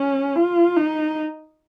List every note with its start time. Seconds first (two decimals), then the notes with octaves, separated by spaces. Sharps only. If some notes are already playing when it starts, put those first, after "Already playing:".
Already playing: C#4
0.36 F4
0.77 D#4